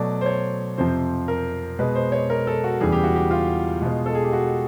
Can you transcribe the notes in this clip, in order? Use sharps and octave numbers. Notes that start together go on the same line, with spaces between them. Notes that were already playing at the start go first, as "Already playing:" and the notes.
Already playing: B2 F#3 A3 D5
C5
C#5
F2 C3 F3 C5
A#4
B2 G#3 B4
C5
C#5
A#4
A4
F#4
E2 C#3 E3 G3 G#4
G4
F#4
G4
F4
B2 G#3
A4
G#4
G4
F#4